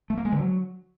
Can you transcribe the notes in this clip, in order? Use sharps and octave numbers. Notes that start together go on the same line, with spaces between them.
A3
A#3
G#3
D3
F#3